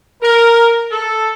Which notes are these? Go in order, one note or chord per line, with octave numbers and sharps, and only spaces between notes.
A#4
A4